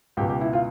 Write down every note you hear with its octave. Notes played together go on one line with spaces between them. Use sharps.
C#2 B2 G4
G4
E4
F4